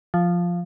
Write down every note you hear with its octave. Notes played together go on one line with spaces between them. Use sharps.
F3